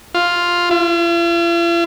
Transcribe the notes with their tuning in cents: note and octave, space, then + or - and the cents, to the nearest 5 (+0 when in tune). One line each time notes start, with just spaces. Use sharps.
F4 +5
F4 -45